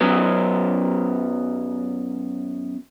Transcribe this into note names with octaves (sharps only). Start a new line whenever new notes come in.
F#2 F#3 B3